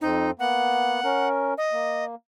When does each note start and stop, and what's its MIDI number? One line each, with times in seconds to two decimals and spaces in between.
0.01 0.31 41
0.01 0.31 60
0.01 0.31 63
0.39 1.01 58
0.39 1.01 59
0.39 1.28 78
1.04 1.54 61
1.04 1.54 70
1.58 2.05 75
1.72 2.15 58